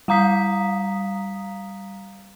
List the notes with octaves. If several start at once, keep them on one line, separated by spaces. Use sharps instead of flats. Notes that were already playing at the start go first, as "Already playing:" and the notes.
G3 F5 A#5 D#6 B6